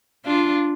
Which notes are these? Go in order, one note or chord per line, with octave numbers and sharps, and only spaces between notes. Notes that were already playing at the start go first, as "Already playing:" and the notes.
D4 F4